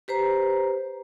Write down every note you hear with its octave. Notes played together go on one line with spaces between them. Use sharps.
G4 B4 C5 A#5